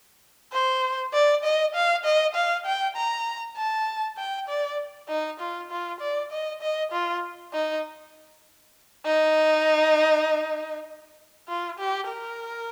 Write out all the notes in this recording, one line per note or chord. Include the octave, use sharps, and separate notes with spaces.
C5
D5
D#5
F5
D#5
F5
G5
A#5
A5
G5
D5
D#4
F4
F4
D5
D#5
D#5
F4
D#4
D#4
F4
G4
A#4